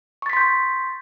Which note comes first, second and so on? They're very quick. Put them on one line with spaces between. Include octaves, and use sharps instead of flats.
C#6 A6 B6 C6 G6